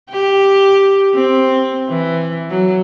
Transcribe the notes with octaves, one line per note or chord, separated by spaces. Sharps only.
G4
C4
E3
F#3